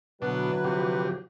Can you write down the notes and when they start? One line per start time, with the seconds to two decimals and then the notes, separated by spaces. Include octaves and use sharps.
0.22 B2 D3 E3 F#3 D4 B4
0.64 C3 F3 G4